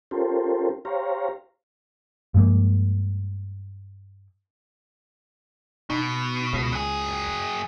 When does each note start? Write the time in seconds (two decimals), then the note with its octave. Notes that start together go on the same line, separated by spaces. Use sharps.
0.11 C#4 F4 G4 A4 A#4 C5
0.85 G4 C5 C#5 F5 A#5
2.34 G2 F3 G#3 A#3
5.90 B2 D#4
6.53 C#2
6.72 F#3 G#4